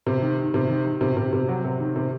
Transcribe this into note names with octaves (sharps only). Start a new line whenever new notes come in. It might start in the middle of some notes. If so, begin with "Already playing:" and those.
C3
D#3
D#3
C3
D#3
D#3
C3
C3
C3
F#3
C3
D#3
C3